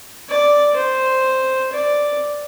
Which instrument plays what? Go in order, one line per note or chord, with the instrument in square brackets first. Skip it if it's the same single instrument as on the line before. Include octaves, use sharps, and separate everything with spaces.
[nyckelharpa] D5
C5
D5